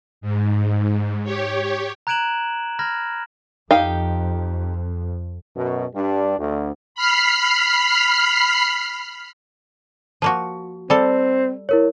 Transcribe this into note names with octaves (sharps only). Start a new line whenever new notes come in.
G#2
G4 C#5
A#5 F#6 G#6 D7 E7 F#7
B5 F6 G#6 A#6
F2 D#4 G4 F5
F#2 B2
G2 G3 D4
D2
B5 F6 C7
F3 A#3 F#4
G3 C4 A4
E4 A#4 C#5